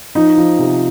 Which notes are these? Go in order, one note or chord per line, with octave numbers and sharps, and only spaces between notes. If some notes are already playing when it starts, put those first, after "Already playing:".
F3 D#4
F3
C3